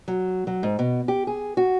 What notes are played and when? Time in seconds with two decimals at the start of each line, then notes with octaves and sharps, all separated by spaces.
0.08 F#3
0.47 F#3
0.63 G#2
0.79 B2
1.08 G4
1.27 G#4
1.57 F#4